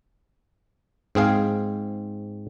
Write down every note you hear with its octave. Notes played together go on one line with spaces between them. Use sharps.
G#2 C4 G#4 F5